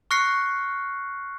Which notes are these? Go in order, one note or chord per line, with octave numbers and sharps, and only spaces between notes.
C#6 F6 F#6 A#6 C7 C#7